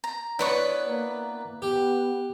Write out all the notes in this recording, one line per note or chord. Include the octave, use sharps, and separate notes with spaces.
A#5
B3 D4 E4 B4 C#5 C#6
A#3
B3 G4